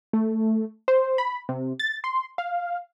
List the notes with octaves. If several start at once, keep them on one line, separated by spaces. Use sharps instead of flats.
A3
C5
B5
C3
A6
C6
F5